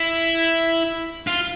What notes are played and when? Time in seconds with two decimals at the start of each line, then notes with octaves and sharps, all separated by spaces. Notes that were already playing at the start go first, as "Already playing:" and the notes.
Already playing: E4
1.27 F4